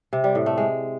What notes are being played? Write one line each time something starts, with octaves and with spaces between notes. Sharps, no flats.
C3
G3
A2
A3
G#3